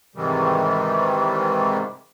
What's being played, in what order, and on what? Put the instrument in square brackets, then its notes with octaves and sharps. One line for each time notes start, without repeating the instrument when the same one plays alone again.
[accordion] G#2 C3 D#3 E3 G3